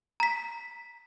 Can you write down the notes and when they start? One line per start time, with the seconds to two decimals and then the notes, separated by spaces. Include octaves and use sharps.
0.20 A#5 B6